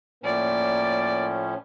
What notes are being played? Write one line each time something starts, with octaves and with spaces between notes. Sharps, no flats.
A2 F3 A#3 C#4 D5